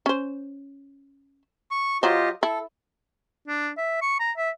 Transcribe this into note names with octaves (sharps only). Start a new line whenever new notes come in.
C#4 C5
C#6
F#3 F4 G4 C5 D#5
E4 A4
D4
E5
C#6
A#5
E5